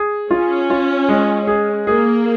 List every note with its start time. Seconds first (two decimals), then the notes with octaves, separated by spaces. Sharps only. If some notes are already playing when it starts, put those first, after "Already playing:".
Already playing: G#4
0.31 C#4 F4
0.70 F4
1.09 G#3
1.47 G#4
1.87 A#3 G#4